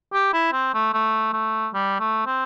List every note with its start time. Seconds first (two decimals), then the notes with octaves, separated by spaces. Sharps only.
0.13 G4
0.33 E4
0.53 C4
0.74 A3
0.94 A3
1.33 A3
1.74 G3
2.00 A3
2.26 C4